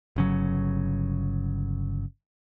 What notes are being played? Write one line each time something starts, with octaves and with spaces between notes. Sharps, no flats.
G1 C#3 F#3